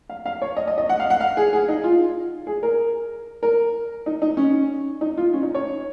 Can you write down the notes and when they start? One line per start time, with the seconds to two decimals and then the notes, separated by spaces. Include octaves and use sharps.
0.09 F5
0.26 F5
0.42 C#5
0.57 D#5
0.67 D#5
0.78 D#5
0.89 F#5
1.00 F5
1.10 F#5
1.20 F5
1.37 G#4
1.53 G#4
1.68 D#4
1.84 F4
2.47 G#4
2.63 A#4
3.43 A#4
4.06 D#4
4.22 D#4
4.37 C#4
5.01 D#4
5.17 F4
5.33 C#4
5.43 D#4
5.54 C#5